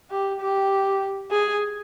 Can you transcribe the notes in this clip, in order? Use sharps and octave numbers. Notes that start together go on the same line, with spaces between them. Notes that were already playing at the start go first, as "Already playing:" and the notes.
G4
G4
G#4